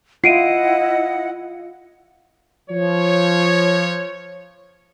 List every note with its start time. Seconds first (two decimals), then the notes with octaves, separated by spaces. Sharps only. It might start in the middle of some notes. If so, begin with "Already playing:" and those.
0.24 E4 F4 D#5 F#5 C7 D7 D#7
2.71 F3 C#5